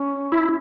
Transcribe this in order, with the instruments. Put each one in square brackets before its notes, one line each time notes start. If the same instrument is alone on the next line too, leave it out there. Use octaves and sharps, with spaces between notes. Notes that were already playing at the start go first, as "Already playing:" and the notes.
Already playing: [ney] C#4
[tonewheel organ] E4